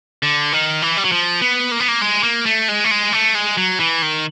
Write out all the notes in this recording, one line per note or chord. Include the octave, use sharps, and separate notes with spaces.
D3
D#3
E3
G3
F#3
F3
B3
A#3
B3
A#3
G#3
A#3
A3
G#3
A3
G#3
A3
G#3
F#3
E3
D#3